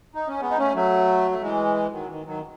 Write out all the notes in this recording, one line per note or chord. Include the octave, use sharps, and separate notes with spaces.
D#4
C#4
G#3 B3
D#4
A3 C#4
F#3 A3
A3
E3 G#3
D#3 F#3
D#3
D#3 F#3